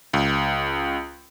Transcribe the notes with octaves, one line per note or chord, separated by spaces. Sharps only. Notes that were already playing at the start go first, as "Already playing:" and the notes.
C#2